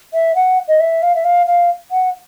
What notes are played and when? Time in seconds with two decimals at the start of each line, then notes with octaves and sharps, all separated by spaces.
0.14 E5
0.35 F#5
0.68 D#5
0.80 E5
1.03 F5
1.15 E5
1.25 F5
1.46 F5
1.91 F#5